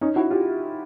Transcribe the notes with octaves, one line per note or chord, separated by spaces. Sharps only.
C#4 D#4
E4 F#4
F4 G4